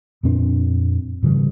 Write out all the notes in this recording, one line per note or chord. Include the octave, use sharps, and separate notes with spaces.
F2 A#2 C4 D4
G#2 C#3 E3 G3